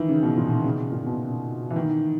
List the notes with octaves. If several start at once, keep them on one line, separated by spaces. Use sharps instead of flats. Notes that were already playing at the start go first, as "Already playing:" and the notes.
Already playing: D#3 E3
C#3
B2
A#2
C#3
A#2
B2
E3
D#3